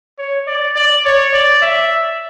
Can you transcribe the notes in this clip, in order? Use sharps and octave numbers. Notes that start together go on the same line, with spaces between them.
C#5
D5
D5
C#5
D5
E5